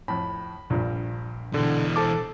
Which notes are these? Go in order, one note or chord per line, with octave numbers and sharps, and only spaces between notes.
F2 A2 B5
A#1 G2 A#2
B2 D3 E3
A4 C5 A5 D6